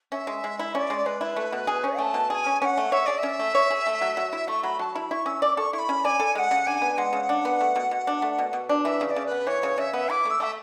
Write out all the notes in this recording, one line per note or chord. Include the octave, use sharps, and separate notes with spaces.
C#4 E5
G#3
G#3
E4
C#4 D5
G#3
G#3 B4
E4
A3
B2
G#4
C#4
A3 A5
B2
G#4 G#5 A5
C#4
C#4 F#5 G#5
A3
C#5 E5
G#4 D5
C#4 E5
A3
C#5
G#4
A3
F#3
F#3
E4
A3 C#6
F#3 B5
F#3 A5
E4 B5
E4 C#6
C#4 E6
D5 D6
A4 C#6
E4 C#6
B5
C#4
D5 G#5
A4
G#3 F#5 G#5
C#3
D4 G#5
B3
G#3 F#5
C#3
D4
B3
A3
B2
B2
D4
A3
B2
B2
D4
E3 E5
C#3 E5
D5
C#3
B4
B3
E3 C#5
C#3
C#3 E5
B3
E4 D6
A3 E6
A3 E5